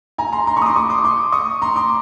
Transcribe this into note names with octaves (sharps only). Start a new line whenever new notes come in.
G#5 A#5
A#5 C6
A#5 C6
B5 C#6
D#6
C6 D6
C#6 D#6
C6 D6
D#6
C6 D6
C#6 D#6
A#5 C6
C6 D6